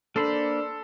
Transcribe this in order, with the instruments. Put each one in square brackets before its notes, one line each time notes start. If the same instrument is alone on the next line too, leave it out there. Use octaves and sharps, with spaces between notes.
[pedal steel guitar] A#3 C5 B5 [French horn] D4 [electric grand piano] A4